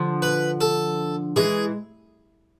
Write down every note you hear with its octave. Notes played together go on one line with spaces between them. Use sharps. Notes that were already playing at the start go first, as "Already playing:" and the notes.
Already playing: D3 F3
B4
A4
E3 G#3 G#4